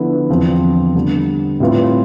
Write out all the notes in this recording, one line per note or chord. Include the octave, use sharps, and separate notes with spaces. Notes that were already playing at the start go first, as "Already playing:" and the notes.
Already playing: D3 F3 B3 E4 B4
E2 D3 F3 C4 F4
D3 G3 B3
A2 G3 C4 F4 B4